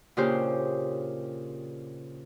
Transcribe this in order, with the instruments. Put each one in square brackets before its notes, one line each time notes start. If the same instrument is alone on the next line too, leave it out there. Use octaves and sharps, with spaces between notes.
[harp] A#2 C#3 D4 F4 G4 C5